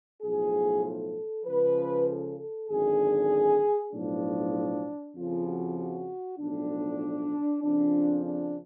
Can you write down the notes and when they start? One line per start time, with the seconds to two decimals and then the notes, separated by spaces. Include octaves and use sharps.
0.22 B1 A2 F3 G#4
0.83 A4
1.45 C#2 C#3 F3 B4
2.07 A4
2.38 A4
2.69 G#1 F#2 D3 G#4
3.92 B1 A2 F3 D4
5.15 F2 C#3 F3 F4
5.46 F#4
5.77 F#4
6.38 B1 A2 F3 D4
7.62 F2 C#3 F3 D4
8.23 D4